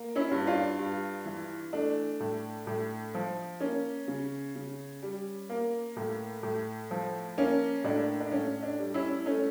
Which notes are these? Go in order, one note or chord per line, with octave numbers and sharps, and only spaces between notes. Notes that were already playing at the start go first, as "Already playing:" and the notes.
Already playing: A#3
C#4 E4
G2
D4 F4
G2
E3
A3 D4
A2
A2
F3
A#3 C#4
C#3
C#3
G3
A#3
A2
A2
F3
A#3 C#4
A2 D4
D4
A2 C#4
D4
G3
C#4 E4
A3 C#4